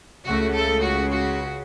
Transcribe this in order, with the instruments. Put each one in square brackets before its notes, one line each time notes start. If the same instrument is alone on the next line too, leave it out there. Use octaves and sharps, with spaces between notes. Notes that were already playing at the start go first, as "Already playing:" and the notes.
[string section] C#2 C#3 A3 F#4
A3 A4
F#4
F#4